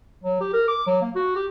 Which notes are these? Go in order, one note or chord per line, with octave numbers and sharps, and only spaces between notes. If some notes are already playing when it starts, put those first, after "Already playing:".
F#3
G4
A#4
D6
F#3
A#3
F#4
G4